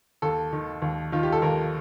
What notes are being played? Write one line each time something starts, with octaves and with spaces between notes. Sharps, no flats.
D#2 A4
D#3
D#2
D#3 F4
G4
A4
D#2 A#4